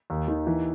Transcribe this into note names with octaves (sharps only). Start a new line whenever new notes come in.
D#2
D#3
E3